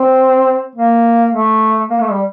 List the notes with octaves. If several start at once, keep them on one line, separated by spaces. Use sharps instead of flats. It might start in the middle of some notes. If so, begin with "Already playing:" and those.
Already playing: C4
A#3
A3
A#3
A3
G3